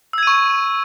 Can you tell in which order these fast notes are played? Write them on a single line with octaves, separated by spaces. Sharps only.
E6 G#6 D#7 C#6